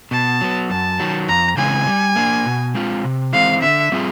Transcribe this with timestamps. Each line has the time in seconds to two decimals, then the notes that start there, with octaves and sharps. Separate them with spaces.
0.11 B2 A5
0.41 F#3 B3
0.70 F#2 A5
1.00 D#3 F#3
1.28 F2 A#5
1.57 C#3 E3 G#3 C4 G#5
1.87 G3
2.16 A#3 D4
2.46 B2
2.74 G#3 C4 F4
3.04 C3
3.33 E3 G#3 C4 F5
3.62 D3 E5
3.92 G3 C4 F4 G#4